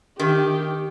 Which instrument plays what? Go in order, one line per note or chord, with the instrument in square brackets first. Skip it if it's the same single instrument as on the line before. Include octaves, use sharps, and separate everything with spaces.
[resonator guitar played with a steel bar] D#3 [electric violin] G4